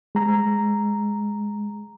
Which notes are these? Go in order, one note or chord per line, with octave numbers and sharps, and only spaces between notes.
G#3 A#5